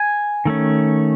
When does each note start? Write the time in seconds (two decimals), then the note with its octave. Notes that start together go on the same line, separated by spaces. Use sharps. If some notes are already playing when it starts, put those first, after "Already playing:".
Already playing: G#5
0.45 D#3 A3 C#4